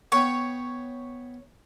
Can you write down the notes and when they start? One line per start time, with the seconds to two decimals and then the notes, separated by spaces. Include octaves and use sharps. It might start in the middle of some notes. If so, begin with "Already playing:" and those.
0.12 B3 C#5 F#5 G5